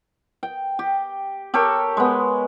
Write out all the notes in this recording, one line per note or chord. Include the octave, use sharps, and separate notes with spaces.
G5
G4
G4 A4 A#4 C#5
G#3 B3